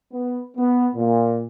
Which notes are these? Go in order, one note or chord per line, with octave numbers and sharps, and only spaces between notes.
B3
B3
A#2